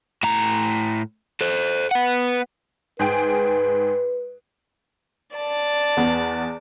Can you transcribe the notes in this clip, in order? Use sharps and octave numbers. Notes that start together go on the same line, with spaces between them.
A2 A#5
A4 C5
B3 F#5
G#2 G#4 B4 G5
D5 A5
E2 B3